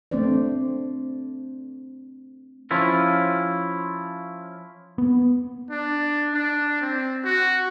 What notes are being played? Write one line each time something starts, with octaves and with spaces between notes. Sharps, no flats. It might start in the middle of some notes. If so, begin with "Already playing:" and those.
A3 C4 D4 C5 D5
F3 C#4 E4 F4
B3
D4
D4
C4
F#4